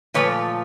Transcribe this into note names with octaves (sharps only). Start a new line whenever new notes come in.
A#2 F3 A3 B4 C#5